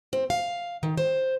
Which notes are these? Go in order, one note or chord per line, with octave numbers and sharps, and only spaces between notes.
C4
F5
D#3
C5